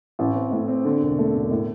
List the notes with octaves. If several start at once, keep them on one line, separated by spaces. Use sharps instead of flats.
A1
C4
A2
C4
D3
E1
A3
E1
A2